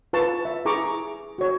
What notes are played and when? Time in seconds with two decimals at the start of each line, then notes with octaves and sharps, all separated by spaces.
0.13 F4 B4 A5 C#6
0.45 E5
0.65 E4 G#4 A#5 C#6 D6
1.38 F#4 C#5